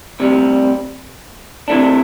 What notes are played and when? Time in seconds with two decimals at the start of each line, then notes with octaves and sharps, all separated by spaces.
0.20 D2 C3 G3
1.68 C3 E3 A3 D4